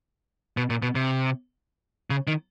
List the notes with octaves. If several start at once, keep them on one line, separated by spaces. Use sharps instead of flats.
B2
A#2
B2
C3
C#3
D#3